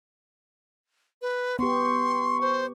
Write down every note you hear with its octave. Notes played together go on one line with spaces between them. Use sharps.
B4
B3 G4 C6 C#6
C5